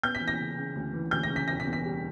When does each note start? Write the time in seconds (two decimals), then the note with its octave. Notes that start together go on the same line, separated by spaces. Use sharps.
0.03 B3 G6
0.15 B6
0.21 E3
0.28 A#6
0.40 C#3
0.57 C#3
0.76 D2
0.93 E3
1.11 D2 G6
1.23 A#6
1.29 C#3
1.36 B6
1.48 E1 A#6
1.60 B6
1.67 E2
1.73 B6
1.85 G3